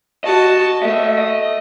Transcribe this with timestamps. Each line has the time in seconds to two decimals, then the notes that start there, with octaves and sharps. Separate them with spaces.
0.24 F#4 D#5 A5
0.82 A3 D#5 E5
1.18 D#5